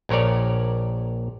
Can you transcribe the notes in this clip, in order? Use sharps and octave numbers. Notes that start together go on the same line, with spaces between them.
A#1 A#2 A#4 C#5 D5